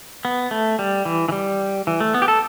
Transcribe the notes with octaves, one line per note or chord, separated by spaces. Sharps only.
B3
A3
G3
E3
E3
G3
E3
A3
B3
G4
A4